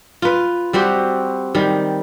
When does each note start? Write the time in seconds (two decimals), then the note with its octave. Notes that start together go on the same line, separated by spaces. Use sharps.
0.22 F4 B4
0.73 G3 C4 F#4 G4
1.55 D#3 G3